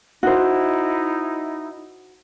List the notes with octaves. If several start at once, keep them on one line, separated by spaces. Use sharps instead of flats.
D#4 E4 F#4 C5